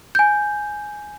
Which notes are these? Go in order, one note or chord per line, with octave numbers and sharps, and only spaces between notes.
G#5 G6